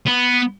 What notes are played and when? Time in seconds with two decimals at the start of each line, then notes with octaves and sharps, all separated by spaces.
0.07 B3